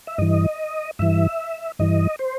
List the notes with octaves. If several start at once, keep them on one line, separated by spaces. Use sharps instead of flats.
E5
G2 E3 D#5
G2 E3 E5
G2 E3 D#5
C5